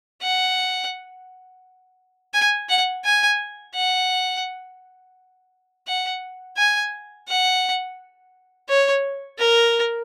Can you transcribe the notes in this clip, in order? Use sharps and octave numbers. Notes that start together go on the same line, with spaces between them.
F#5
G#5
F#5
G#5
F#5
F#5
G#5
F#5
C#5
A#4